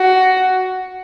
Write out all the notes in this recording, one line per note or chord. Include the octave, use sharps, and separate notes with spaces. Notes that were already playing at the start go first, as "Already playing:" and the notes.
Already playing: F#4